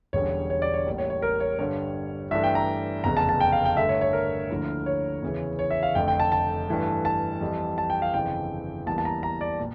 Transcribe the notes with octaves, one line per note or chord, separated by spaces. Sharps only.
E1 E2 D3 G3 C#4 C#5
C#5
D5
C#5
A1 A2 G3 A#3
C#5
C#5
A#4
C#5
G2 D3 G3 C#5
G2 E3 A3 D4 E5
G5
A#5
F1 E2 C#3 A#5
A5
A5
G5
F5
G5
G2 D3 A3 E5
C#5
C#5
A#4
D2 D3 F3 A#3 E4
C#5
E2 C#3 E3
C#5
E5
F5
F1 F2 D3 A3 G5
G5
A5
A5
G2 E3 A3
A5
F2 E3 G3
A5
G5
F5
G1 F2 C#3 E3 G5
E2 E3 G3 A#3 A5
A5
A#5
A#5
D5
A#2